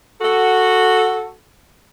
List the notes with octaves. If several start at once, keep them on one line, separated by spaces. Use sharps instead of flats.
F#4 A4